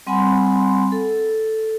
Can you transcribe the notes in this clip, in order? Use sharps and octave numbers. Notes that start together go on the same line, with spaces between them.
G3 C4 F#5 G#5 B5 C6
A4